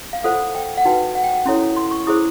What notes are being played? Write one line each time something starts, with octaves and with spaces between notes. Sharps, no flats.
F5
F4 A4 C5 F#5
G5
F#5
D#4 F#4 B4 G5
F#5
G5
F#5
C#4 E4 A4 C#5 C6
C6
C#6
E4 G#4 C5 D#6